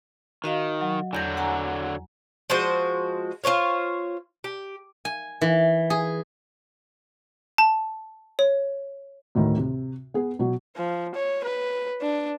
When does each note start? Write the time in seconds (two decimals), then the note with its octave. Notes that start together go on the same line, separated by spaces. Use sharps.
0.44 D#3 F#4 D#5 F5
0.81 F#3
1.13 E2 D3 F#3 G6 A#6
1.37 F#5 G#5 A#5
2.50 F3 G#3 F#4 C5
3.44 F4 C5 C#5 F5
4.44 G4
5.05 G#5
5.41 E3
5.90 G#4
7.58 A5
8.39 C#5
9.35 D2 A2 D#3
9.57 C3
10.14 B3 G#4
10.39 B2 F#3
10.76 F3
11.15 C#5
11.44 B4
12.01 D4